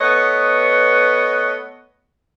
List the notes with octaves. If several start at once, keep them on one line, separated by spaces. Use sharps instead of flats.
A3 B3 B4 C#5 D#5